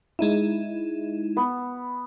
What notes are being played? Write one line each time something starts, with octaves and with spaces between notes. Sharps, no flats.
G#3 D#4 E4
B3